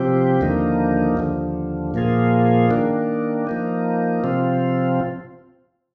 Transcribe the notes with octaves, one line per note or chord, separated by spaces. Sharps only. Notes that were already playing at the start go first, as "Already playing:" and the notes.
Already playing: C3 F3 C4 G4
D#2 D3 F3 A#3 D#4
D#2 D3 F3
A#2 F3 A#3 F4 G#4
D#3 A#3 D4
F3 A#3 D#4
C3 F3 C4 F4